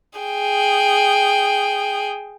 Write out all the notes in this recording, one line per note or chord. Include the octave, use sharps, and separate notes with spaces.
G#4 G5